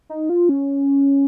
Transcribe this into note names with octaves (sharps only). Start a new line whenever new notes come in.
D#4
F4
C#4